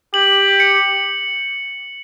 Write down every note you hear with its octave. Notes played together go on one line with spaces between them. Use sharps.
G4 F#7
C#7